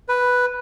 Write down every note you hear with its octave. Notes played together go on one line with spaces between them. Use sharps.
B4